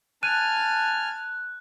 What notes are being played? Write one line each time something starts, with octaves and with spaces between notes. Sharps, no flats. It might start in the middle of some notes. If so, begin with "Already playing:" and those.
G#5 A5 F6 F#6 D#7